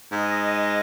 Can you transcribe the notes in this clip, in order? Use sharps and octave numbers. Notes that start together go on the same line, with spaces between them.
G#2 D#5